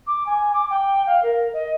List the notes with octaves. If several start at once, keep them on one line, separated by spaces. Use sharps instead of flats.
D6
G#5
D6
G5
F5
A#4
D#5